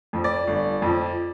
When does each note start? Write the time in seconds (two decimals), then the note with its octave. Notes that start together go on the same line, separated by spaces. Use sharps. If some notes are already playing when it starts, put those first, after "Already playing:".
0.13 F2 F3
0.24 D5
0.47 G1
0.82 F2 F3